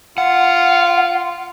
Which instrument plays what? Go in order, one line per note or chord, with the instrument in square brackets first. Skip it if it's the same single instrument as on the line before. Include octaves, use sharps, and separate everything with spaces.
[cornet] F4 [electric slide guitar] F#5